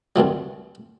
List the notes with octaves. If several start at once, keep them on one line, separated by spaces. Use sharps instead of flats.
C2 G2 C3 F#3